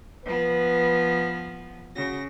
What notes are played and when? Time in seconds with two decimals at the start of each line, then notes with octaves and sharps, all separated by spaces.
0.25 F3 B3 B4
1.95 C#3 F#4 A#6